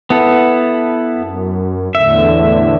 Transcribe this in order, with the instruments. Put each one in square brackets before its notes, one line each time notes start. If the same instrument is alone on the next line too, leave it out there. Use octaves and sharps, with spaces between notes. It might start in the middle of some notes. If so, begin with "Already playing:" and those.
[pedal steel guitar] B3 E4 A4
[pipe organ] F#2
[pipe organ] E2 A2 D3 [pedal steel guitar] E5